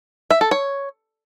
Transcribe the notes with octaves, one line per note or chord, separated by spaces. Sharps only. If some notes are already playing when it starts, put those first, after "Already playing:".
E5
A4
C#5